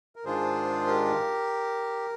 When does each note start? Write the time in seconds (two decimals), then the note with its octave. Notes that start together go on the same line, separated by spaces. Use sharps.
0.16 A#4
0.25 G#2 D#3 G#3 D4 F4 G#4 C5
0.86 G4 A#4